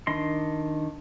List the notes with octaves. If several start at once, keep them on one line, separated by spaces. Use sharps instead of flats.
D#3 D4 D#5 C6